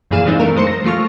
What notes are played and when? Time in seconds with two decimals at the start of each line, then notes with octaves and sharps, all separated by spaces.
0.11 F#2 A#2 E3 G#4 F5 E7
0.25 E3 G#3 C4 D4 D#4
0.40 A3 A#4
0.56 F#2 G#3 C5 C6 C#7
0.67 A#6
0.84 F3 A3 F4 C#6 F6